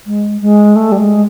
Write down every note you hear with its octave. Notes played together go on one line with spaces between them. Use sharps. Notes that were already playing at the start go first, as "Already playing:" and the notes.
G#3
G#3
A3
G3
G#3